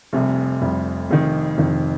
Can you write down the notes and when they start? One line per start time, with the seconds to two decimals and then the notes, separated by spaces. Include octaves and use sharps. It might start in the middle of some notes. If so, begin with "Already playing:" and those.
0.13 F1 F2 C3 G3
0.61 F1 F2 C3 G3
1.10 F1 F2 D#3
1.57 F1 F2 D#3